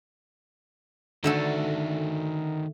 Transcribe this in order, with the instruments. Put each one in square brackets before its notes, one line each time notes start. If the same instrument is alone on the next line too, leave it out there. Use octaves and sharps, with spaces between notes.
[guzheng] D3 A3 A4 [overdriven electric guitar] D#3 F#4